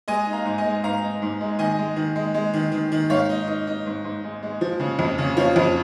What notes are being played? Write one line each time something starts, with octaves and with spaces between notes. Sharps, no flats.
G#3 D#5 G#5
D#4
F5 A#5
G#2
D#5 G#5
G#3
G#2 F5 A#5
D#4
G#2
G#3
D#3 D#5 G#5
G#3
D#3
G#3
G#3
D#3
D#3
D#3
G#2 C#5 F5
D#4
D#4
D#4
G#2
G#2
G#3
G#3
F3
C#3
F2
C#3
F3 C#5 F5
F2